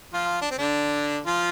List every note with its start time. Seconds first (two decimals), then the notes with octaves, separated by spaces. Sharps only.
0.13 F3 F4
0.41 D4
0.51 C4
0.58 D3 D4
1.26 F3 F4